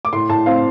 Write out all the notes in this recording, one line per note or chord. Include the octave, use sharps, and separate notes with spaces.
D6
A2 C6
A2 A5
C4 F5